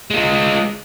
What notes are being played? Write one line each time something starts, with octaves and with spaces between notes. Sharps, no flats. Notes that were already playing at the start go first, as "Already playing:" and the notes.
G#3 F4